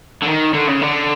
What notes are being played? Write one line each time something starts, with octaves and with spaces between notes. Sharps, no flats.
D3
D#3
D3
C#3
D3